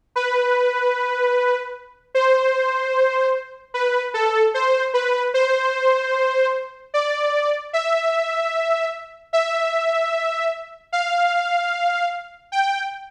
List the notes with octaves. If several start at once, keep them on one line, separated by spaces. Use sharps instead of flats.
B4
C5
B4
A4
C5
B4
C5
D5
E5
E5
F5
G5